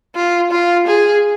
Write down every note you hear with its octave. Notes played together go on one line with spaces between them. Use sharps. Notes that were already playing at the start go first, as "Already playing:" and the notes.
F4
F4
G#4